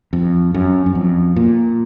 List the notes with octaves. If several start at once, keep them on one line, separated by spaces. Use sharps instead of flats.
F2
F#2
F#2
F2
A#2